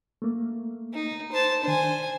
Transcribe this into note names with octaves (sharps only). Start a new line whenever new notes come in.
A3 A#3
D#4
C5 A5
D#3 D4 C5 G#5